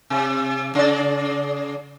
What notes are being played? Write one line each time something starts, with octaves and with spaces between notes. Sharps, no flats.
C3
C#3 D5